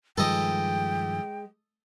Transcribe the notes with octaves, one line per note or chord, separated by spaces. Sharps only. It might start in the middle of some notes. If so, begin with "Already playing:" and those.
G2 D#3 F3 G#3 A4 B4 D#5 G5